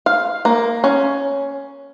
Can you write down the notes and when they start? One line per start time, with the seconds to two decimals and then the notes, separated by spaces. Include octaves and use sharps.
0.06 F5
0.45 A#3
0.84 C#4